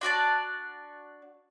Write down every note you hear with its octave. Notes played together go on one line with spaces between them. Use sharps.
D4 F#4 D5 A5